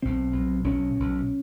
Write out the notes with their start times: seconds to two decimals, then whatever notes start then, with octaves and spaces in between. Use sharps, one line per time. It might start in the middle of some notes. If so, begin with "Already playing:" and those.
0.02 B1 B2 C4
0.33 B1 B2
0.64 B1 B2 C#4
0.95 B1 B2